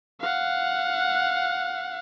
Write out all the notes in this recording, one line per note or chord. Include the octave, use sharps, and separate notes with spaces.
F5 F#5